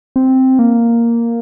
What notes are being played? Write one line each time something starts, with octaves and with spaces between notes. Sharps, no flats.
C4
A#3